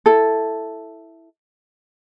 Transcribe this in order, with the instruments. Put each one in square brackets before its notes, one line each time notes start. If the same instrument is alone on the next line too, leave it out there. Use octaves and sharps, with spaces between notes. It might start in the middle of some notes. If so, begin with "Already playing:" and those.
[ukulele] E4 A4